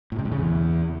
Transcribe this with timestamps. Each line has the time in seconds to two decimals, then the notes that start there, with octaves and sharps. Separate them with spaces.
0.12 A2
0.19 C3
0.25 G2
0.32 C#3
0.38 E2